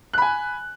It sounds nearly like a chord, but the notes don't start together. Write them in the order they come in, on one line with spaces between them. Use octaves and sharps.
F#6 B5 G#5